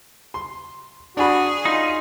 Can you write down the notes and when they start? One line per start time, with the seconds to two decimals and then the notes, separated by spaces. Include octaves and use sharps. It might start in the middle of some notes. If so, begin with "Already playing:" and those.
0.34 C6
1.17 D4 F#4 G#4 G#5 B5
1.65 D#4 F4